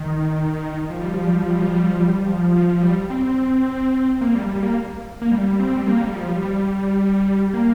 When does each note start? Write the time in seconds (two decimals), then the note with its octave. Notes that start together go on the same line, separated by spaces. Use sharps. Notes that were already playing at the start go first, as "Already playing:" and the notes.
Already playing: D#3
0.90 F3
1.01 G3
1.14 F3
1.26 G3
1.38 F3
1.50 G3
1.62 F3
1.74 G3
1.87 F3
2.00 G3
2.28 F3
2.56 F3
2.69 F3
2.82 G3
3.10 C4
4.21 A#3
4.35 G3
4.49 G3
4.63 A#3
5.22 A#3
5.32 G3
5.60 C4
5.77 G3
5.87 A#3
6.01 G3
6.15 F3
6.28 G3
6.42 G3
7.54 A#3